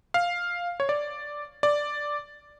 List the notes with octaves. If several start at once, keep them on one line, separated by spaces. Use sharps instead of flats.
F5
C#5
D5
D5